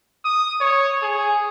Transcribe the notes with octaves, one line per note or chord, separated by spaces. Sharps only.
D#6
C#5
G#4